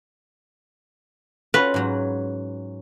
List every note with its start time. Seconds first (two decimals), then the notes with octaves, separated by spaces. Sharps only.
1.54 C#4 F4 F#4 B4
1.74 G#2 F#3